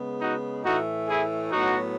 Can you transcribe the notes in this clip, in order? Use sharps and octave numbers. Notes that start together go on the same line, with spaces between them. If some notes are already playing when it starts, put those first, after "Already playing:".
Already playing: C#3 G#3 B3
D#4 F#4
A2 E3 A3 D#4 F#4
E4 G#4
A2 F#3 B3 D#4 F#4